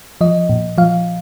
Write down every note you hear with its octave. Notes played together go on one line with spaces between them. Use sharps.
F3 D#5
A#2
F3 F5